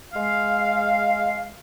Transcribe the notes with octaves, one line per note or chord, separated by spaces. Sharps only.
G#3 F5